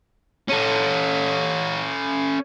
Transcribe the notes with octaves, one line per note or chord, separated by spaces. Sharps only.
C#4 A4